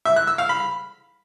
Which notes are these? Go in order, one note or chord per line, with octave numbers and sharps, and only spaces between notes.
E5
F#6
E6
F5
B5